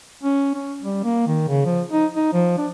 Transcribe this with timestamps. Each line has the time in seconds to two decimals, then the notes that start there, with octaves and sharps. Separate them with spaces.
0.23 C#4
0.54 C#4
0.81 G3
1.04 A#3
1.27 D#3
1.48 C#3
1.65 F3
1.92 D#4
2.16 D#4
2.33 F3
2.58 D4